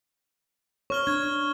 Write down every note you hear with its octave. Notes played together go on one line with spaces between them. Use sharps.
C#5 C#6 F6 G7
D4 G#6